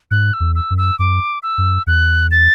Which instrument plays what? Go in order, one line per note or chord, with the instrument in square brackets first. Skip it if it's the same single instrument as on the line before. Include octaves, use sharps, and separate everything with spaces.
[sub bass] G#2 [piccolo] F#6
[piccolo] E6
[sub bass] E2
[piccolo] E6
[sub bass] F#2
[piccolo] E6
[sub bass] F#2 [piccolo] D6
[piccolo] E6
[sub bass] F#2
[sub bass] E2 [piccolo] F#6
[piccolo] A6